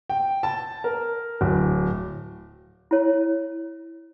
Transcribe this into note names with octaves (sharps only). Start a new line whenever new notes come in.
G5
A5
A#4
D1
E4 C#5